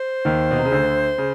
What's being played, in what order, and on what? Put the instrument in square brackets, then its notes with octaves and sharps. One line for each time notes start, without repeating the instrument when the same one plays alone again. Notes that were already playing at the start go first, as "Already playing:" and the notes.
Already playing: [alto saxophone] C5
[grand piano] D#2 D#3
B2
C3
C#3
D2 D3
C#3